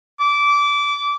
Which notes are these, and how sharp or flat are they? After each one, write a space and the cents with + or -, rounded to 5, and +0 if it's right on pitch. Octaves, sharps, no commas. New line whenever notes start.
D6 -20